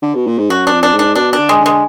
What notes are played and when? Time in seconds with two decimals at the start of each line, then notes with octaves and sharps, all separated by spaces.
0.03 D3
0.15 B2
0.27 A#2
0.38 G#2
0.50 F#2 F#4
0.67 D4
0.72 F2
0.83 D4
0.93 G#2
0.99 D4
1.15 B2 D4
1.33 D4
1.38 D3
1.49 G#3
1.60 D3
1.66 G#3